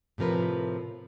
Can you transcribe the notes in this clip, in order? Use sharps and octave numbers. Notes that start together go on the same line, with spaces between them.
A2 C3 F3 A#4 B4